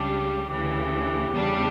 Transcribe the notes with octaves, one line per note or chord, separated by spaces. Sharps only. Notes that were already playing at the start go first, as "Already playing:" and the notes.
Already playing: C#2 C#3 G3 D4 G4
D2 C#3 E3 G4
E2 C#3 G3 D4